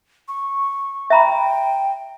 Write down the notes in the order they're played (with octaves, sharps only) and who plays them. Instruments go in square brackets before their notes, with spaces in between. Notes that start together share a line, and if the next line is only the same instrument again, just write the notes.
[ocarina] C#6
[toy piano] E5 A#5 B5 [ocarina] G5